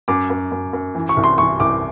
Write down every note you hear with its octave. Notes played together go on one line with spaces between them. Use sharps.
F#2 D6
F#2
F#2
F#2
E3
C#6
C2
C6
E3 C#6
C2 D6